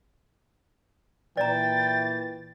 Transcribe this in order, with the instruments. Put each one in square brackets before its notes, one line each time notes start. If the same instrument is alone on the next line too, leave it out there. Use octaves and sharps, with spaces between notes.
[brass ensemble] A#2 E3 [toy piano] D5 A#5 [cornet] G5 [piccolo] A6